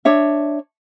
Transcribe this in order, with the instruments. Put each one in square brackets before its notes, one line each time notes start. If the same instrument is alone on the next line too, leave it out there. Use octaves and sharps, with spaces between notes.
[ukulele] D4 C#5 E5